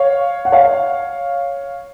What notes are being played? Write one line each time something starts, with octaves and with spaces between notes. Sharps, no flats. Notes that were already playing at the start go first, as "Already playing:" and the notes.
Already playing: C#5 F5
F#5
C#5 F5